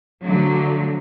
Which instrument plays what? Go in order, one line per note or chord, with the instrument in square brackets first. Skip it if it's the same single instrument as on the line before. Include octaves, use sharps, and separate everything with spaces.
[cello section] D3 F3 F#3 A3